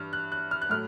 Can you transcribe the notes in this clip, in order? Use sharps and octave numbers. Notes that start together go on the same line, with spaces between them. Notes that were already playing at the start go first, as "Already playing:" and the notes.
Already playing: G2 E3 F6
F#6
F#6
F6
F#6
A2 F#3 A3 F6